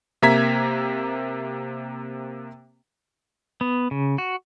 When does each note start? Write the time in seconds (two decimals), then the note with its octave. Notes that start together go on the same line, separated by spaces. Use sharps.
0.22 C3 A#3 E5 A#5 G#6 B6
3.61 B3
3.91 C#3
4.18 F#4